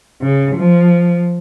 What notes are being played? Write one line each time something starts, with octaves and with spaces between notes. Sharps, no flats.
C#3
F3